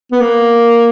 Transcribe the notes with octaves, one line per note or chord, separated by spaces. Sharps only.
B3
A#3